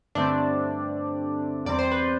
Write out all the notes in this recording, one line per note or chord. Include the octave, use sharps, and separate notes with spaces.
G2 D3 A3 C4 D4 D5
E2 C3 G3 C4 D5
C5
B4